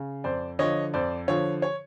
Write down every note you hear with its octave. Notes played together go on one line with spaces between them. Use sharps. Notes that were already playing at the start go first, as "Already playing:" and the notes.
Already playing: C#3
F2 C5 D5
D3 F3 C#5 D#5
F2 C5 D5
D3 F3 C#5
C#5